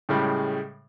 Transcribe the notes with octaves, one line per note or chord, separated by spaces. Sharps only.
A2 C#3 G3 G#3